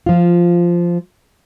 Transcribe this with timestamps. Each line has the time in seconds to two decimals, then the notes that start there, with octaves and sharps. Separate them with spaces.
0.06 F3 F4